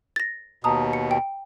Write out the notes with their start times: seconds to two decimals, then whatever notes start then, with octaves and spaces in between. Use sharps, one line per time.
0.16 A6 A#6
0.64 D#2 B2 A5 A#5 D#6
0.93 C#7
1.11 G5